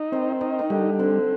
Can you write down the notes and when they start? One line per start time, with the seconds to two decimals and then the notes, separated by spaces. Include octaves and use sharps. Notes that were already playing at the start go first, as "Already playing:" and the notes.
Already playing: D#4
0.12 D#3 C4
0.41 D#3 D#4
0.59 D#3
0.70 D3 G3
0.99 D3 C4